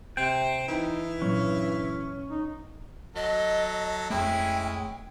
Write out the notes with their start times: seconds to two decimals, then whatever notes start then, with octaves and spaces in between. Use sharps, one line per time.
0.17 C3 C4 G5
0.68 E3 D#4
1.22 G2 A#2 F#3 C#4
2.30 D#4
3.16 F#3 A4 D#5
4.10 F2 G#3 A3 C#4 E4 G5